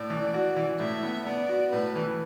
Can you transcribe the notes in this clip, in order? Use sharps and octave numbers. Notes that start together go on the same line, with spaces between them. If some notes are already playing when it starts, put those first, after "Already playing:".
Already playing: A2 D5
E3
F#4
E3
A2 E5
B3
B3 D5
F#4
A2 B4
E3